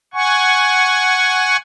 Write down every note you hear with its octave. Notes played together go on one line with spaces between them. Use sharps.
F#5 G#5 C#6